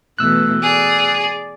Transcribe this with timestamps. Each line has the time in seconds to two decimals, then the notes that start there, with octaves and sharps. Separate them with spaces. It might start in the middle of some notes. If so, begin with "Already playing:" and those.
0.19 B2 E3 A3 E6 F#6
0.63 G#4 D5